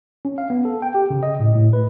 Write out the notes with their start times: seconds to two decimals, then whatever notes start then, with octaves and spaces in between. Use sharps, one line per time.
0.25 C#4
0.38 F5
0.50 B3
0.65 A4
0.82 G5
0.95 G4
1.10 C#3
1.23 D#5
1.40 A2
1.55 A2
1.73 B4